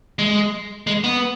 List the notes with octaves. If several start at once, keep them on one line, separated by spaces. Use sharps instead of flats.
G#3
G#3
B3